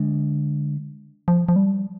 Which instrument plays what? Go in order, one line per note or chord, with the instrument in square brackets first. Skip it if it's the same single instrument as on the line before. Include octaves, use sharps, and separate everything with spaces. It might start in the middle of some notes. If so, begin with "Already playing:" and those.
Already playing: [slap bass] D3 G#3 D4
[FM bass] F3
F3
G3